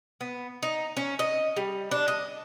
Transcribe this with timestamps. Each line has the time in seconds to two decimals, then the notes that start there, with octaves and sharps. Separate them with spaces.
0.21 B3
0.63 D#4
0.97 C#4
1.19 D#5
1.57 G3
1.91 D4
2.08 D#5